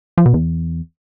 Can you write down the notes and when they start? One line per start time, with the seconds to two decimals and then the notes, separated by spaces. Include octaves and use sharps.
0.18 F3
0.26 B2
0.34 E2